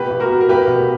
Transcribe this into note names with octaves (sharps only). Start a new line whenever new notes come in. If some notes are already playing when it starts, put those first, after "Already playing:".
Already playing: B2 G4 B4
B2
F#4 A#4
B2
A#4
B2 G4 B4
B2